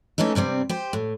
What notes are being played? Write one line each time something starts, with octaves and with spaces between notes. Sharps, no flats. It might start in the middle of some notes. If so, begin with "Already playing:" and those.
E3 A3 C#4 D#4 A4
G2 C3 G3 C4
G4 C5
A2